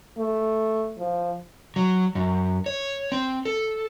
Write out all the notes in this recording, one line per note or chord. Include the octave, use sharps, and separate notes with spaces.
A3
F3
F#3
F#2
C#5
C4
A4